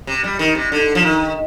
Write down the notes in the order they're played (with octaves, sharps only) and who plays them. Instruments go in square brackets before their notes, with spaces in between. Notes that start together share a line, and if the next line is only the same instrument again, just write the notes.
[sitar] C3
G3
D#3
C3
D3
F3
D#3